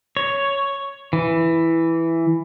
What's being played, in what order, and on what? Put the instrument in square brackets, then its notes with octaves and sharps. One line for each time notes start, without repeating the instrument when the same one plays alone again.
[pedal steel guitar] C#5
E3